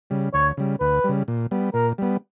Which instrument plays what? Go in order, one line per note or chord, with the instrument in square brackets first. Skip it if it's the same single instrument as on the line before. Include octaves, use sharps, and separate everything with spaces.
[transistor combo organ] C#3 G3
[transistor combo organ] D2 [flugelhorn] C#5
[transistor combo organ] C#3 G3
[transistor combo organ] D2 [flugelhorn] B4
[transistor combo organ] C#3 G3
A#2
G3 B3
[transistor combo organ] A#2 [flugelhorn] A#4
[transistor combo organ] G3 B3